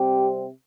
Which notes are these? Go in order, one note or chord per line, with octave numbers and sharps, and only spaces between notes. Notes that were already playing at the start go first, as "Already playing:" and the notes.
Already playing: C3 G3 C4 G4